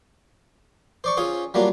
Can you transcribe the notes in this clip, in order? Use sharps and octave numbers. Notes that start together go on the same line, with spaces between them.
C5 D5 C#6
C#4 F4 G#4 C5
F#3 G3 A#3 D4 F4